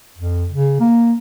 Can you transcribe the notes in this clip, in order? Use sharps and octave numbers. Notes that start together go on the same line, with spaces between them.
F2
C#3
A#3